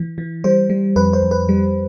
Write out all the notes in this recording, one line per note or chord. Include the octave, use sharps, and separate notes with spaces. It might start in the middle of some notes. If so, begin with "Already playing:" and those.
Already playing: E3
E3
G3 C5
G3
F2 B4
C5
F2
B4
G3